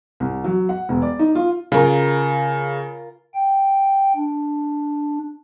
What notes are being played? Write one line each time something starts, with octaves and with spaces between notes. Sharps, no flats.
C2
F#3
F#5
E1
D5
D#4
F4
C#3 F4 A#4
G5
D4